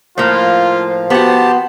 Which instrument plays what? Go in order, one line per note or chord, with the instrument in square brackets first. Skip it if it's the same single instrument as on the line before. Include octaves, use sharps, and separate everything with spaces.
[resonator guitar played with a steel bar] A2 A#3 [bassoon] F3 [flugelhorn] F4
[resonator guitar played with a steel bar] B3 F#4 [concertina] G4 A5 [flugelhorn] C5